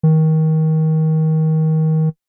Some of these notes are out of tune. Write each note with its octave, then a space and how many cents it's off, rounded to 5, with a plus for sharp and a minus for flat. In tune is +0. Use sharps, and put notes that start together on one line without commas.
D#3 +25